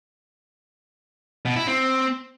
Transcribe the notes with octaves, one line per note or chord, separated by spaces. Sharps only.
B2
E4
C4